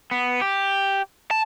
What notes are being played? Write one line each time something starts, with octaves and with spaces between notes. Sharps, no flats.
B3
G4
A5